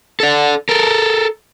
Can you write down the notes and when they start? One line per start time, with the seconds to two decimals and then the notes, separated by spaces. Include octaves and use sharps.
0.20 A4 D5
0.69 A4 A#4